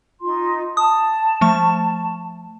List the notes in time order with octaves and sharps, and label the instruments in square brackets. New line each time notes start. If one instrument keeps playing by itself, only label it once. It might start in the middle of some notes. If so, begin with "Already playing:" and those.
[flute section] D#4 F4 C6
[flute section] A5 [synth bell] D#6
[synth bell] F3 A3 C#6